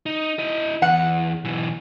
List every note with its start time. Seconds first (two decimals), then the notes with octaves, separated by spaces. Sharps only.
0.06 D#4
0.39 E4 D#5
0.82 E2 F#5
1.44 B1 E3